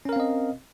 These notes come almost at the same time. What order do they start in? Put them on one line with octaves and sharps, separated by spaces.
C#4 A#4 F5 C4 D#5